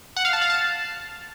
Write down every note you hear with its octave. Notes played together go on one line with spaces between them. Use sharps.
F#5
F5
A5
F5
A5